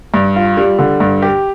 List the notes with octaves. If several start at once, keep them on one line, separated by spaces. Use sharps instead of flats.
G2
F4
G3
D3
G2
G4